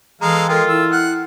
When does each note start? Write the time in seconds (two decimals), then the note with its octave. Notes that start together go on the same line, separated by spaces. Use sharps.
0.21 E3 G#3 A4 F5 A#5
0.48 G#3 F4 A4 A#4 G5
0.68 E4 E6
0.92 F#5 F6